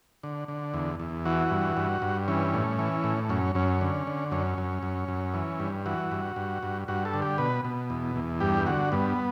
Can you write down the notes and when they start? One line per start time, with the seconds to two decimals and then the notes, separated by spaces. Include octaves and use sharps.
0.23 D3
0.48 D3
0.74 E2
0.99 E2
1.25 E3 F#4
1.51 G2
1.77 G2
2.02 G2
2.28 E3 C#4
2.54 A2
2.79 E3
3.04 A2
3.29 F#2 C#4
3.55 F#2 C#4
3.81 D3
4.07 D3
4.31 F#2 C#4
4.58 F#2
4.83 F#2
5.08 F#2
5.34 E3
5.60 G2
5.86 E3 F#4
6.12 G2
6.36 G2
6.63 G2
6.88 G2 F#4
7.05 A4
7.14 D3
7.22 G4
7.38 B2 B4
7.64 B2
7.90 E2
8.16 E2
8.41 G2 G4
8.66 D3 F#4
8.92 G2 B3